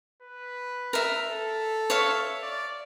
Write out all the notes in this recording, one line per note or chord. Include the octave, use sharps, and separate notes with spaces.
B4
A#4 E5
A4
C#5 E5 F5
D5